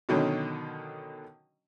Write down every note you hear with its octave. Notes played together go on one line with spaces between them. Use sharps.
B2 D3 D#3 F#3 C#4